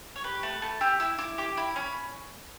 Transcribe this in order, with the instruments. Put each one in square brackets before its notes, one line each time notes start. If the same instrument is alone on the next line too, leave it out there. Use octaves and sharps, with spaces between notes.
[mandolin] C#5
G4 B4
A3 B4
A3 A5
G4 E6
E4 E6
E4 D6
G4 D6
E4 B5
C#4 B5